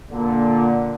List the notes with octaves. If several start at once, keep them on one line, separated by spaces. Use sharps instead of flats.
A#2 D3